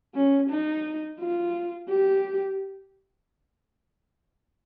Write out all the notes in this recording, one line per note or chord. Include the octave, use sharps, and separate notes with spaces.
C#4
D#4
F4
G4